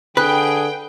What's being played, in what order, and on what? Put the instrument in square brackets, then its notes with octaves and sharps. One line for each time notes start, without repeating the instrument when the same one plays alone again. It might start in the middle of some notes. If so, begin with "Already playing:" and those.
[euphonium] D3 [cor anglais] G#4 [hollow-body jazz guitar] B4 [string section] G5